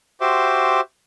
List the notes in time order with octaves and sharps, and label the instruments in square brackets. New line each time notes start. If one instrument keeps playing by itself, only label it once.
[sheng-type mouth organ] F#4 G4 C5 E5 C6 D6